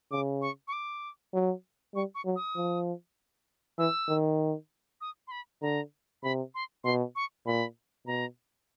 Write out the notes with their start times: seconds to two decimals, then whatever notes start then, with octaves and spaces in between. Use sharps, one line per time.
0.11 C#3 D6
0.42 C#6
0.68 C#6
0.73 D6
1.34 F#3
1.95 G3 C#6
2.15 C#6
2.25 F#3
2.36 D#6
2.56 F3
3.78 E3 E6
4.09 D#3
5.01 D#6
5.28 C6
5.31 B5
5.62 D3 A#5
6.23 C3 B5
6.55 C6
6.84 B2 C6
7.16 C#6
7.46 A#2 B5
8.06 B2 A#5